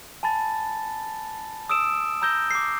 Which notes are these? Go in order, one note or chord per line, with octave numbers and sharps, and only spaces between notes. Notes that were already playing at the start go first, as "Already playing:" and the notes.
G#5 A5 B5 A6
D#6 E6 D7 E7
A#5 E6 G6 A#6 G7
D6 C7